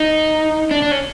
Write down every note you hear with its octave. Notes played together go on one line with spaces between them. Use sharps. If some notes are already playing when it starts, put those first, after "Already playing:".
Already playing: D#4
D4
D4
C#4